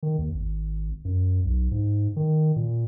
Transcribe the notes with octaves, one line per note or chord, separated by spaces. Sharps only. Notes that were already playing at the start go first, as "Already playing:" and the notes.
D#3
D#2
G#1
F#2
B1
G#2
D#3
A#2